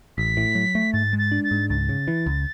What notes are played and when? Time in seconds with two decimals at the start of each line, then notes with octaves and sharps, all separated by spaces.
0.18 A1 B6
0.37 A2
0.55 F#3
0.75 A3
0.93 G#2 A6
1.13 G#3
1.19 A6
1.32 D4
1.44 A6
1.51 G#2
1.70 C#2 A6
1.89 C#3
2.08 E3
2.26 C#2